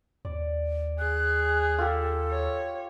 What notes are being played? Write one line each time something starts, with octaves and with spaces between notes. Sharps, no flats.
D#2 D5
G#4 F#6
F4 G4 A4
C#5